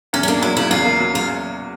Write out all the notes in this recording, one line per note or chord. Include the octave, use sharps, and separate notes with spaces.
E2 C#4
C#4
A#3 D4
F#3 E4
C#3 E4
E2 F4
A#3
F#3
C#3 F4